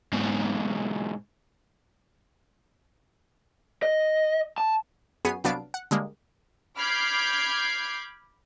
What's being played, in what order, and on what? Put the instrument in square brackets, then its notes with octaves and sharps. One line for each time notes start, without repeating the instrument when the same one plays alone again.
[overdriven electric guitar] G#2 B2
[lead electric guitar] D#5
A5
[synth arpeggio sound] F#2 B3 G#4 C#5 C7 D#7
C2 F#3 B3 D4 F5 D7
F#5
D3 G3 G#3 A#3
[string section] B5 D6 F6 G6 G#6 C7